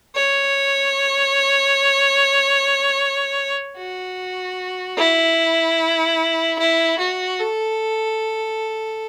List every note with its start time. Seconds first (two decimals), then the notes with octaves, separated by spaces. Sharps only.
0.15 C#5
3.77 F#4
4.98 E4
6.59 E4
6.99 F#4
7.40 A4